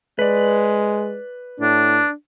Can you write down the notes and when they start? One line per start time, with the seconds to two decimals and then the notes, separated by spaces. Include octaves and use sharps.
0.19 G#3 B4 D5
1.60 A2 D4